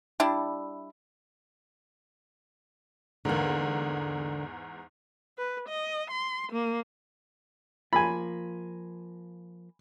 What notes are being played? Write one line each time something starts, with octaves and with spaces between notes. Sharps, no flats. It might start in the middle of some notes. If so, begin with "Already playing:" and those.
G3 D4 E4
E2 G#2 D3 A#3
B4
D#5
C6
A#3
F3 A#3 F4 G#5 B5